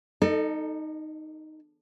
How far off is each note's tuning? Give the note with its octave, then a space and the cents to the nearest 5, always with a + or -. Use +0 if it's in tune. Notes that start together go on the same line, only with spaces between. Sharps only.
D#4 +0 A4 +15 D#5 -45